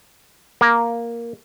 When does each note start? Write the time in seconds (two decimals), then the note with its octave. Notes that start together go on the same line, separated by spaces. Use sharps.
0.61 A#3